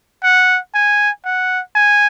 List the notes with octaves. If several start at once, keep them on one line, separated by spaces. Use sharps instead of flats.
F#5
G#5
F#5
G#5